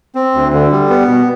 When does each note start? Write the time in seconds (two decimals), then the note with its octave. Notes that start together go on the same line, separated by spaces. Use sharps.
0.15 C4
0.34 D2
0.53 D3
0.71 G3
0.90 B3
1.08 B2